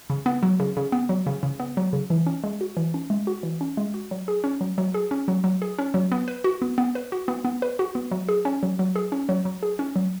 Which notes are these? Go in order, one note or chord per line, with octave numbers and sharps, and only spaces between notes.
C#3
B3
F#3
C#3
C#3
B3
F#3
C#3
C#3
B3
F#3
C#3
E3
C#4
G#3
F#4
E3
C#4
G#3
F#4
E3
C#4
G#3
F#4
F#3
G#4
C#4
F#3
F#3
G#4
C#4
F#3
F#3
G#4
C#4
F#3
B3
B4
F#4
B3
B3
B4
F#4
B3
B3
B4
F#4
B3
F#3
G#4
C#4
F#3
F#3
G#4
C#4
F#3
F#3
G#4
C#4
F#3